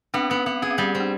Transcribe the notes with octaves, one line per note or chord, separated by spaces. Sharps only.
B3 C4 D4
B3 C#4
B3 C4
C#4 G#4
C4
G3 C#4
C4
D4